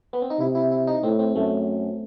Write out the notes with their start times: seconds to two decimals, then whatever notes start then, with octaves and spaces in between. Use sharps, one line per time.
0.13 B3
0.22 C4
0.30 D#4
0.39 C3 E4
0.55 E4
0.71 E4
0.87 D#4
1.03 A2 C4
1.19 C4
1.35 F#2 A3